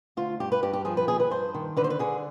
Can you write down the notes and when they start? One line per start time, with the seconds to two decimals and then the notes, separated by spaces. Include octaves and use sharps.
0.17 D2 F4
0.40 G2 G4
0.52 B4
0.63 G2 G4
0.73 G4
0.85 F3 G#4
0.97 B4
1.08 D#2 G#4
1.20 B4
1.30 G2 C5
1.54 D#3
1.77 D3 B4
1.84 C5
1.90 B4
1.99 D3 G#4